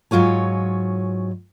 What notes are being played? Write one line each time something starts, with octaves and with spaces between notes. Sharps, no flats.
G#2 F#3 F4 C#5 G#5